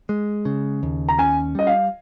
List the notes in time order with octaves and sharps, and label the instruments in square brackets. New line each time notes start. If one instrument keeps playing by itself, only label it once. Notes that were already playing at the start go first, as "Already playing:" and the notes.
[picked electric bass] G#3
C#3
D#2
[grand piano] A#5
[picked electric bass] C#4 [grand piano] G#5
[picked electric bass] G3 [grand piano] D#5
[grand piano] F5